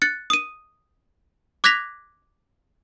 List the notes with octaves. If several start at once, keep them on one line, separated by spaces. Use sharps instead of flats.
F#6 A6 C#7
D#6 D#7
D6 F#6 G#6 A#6 B6 F7